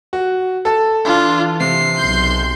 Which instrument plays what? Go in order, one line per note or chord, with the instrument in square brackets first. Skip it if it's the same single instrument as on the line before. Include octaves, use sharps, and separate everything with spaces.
[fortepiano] F#4
A4 A5
[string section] E3 [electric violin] D4 F4
[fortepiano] C3 [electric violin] C7
[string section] B1 C6 G6